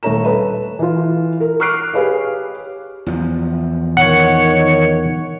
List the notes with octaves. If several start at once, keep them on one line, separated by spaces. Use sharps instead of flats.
D#1 A3 C#5 A#5 E7
A4 B4
E3 F4
A#4
C#6 D6 F6 F#6 C7 D7
G4 G#4 B4 C#5 F5
E2 F3
D#3 C#5 F#5